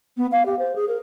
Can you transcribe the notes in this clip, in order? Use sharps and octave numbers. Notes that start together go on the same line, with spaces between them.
B3
F5
G4
C5
G#4
A#4